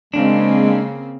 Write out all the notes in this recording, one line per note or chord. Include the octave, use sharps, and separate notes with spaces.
C#3 G#3 A#3 C4 D4